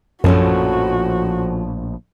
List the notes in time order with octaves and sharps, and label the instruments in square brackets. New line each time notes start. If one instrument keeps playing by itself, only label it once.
[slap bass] A#1 A2 [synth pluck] F#2 [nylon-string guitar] F3 C#4 A4 [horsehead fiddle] F#4